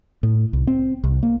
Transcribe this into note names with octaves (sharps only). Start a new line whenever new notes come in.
A2
C2
C4
C2
A#3